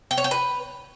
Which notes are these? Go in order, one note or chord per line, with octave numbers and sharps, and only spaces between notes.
G5
C#5
G5
B4